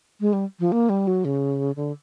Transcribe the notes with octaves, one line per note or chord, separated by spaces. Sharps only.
G#3
G3
F3
A#3
G3
F#3
C#3
D3